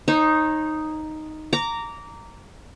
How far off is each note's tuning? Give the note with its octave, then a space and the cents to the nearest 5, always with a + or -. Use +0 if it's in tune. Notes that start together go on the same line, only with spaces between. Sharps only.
D#4 +0 C#5 -40
A#5 -10 D6 -20